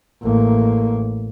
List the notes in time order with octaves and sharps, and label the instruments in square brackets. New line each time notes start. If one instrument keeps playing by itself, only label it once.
[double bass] A1 A#3